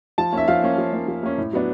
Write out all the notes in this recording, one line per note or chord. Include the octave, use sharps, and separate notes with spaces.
F3 A5
A#3 C#4 E5
F3 F5
A#3 C#4
F3
A#3 C#4
F3
A#3 C#4
A2
F#3 B3 D4